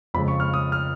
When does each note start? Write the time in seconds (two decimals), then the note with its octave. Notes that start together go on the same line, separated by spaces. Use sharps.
0.14 F2 C#3 G#3 B5
0.28 C#6
0.40 F6
0.54 D#6
0.72 F6